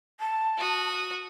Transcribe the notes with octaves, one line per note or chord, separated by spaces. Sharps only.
A5
F#4 D#6